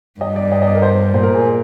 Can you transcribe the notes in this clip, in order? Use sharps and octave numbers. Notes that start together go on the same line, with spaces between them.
G2 D#5
D5
D#5
D#5
D5
A#4
C5
A#2 C5
A#4
G#4